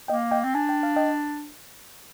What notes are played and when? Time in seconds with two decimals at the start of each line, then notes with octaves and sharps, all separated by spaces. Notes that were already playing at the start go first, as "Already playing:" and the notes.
0.08 A#3 D#5 G5
0.31 D#5 G5
0.44 C4
0.55 D4 G#5
0.69 G5
0.83 F5
0.96 D#5 G5